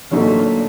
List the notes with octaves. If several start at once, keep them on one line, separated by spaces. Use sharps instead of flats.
A#2 D3 F#3 A3 D#4 A4